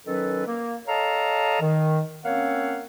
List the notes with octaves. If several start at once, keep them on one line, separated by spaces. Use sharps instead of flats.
D#3 F#3 C#4 A4 B4
A#3
A4 C#5 D#5 F5 A5 A#5
D#3
A#3 C4 C#4 C#5 F5 F#5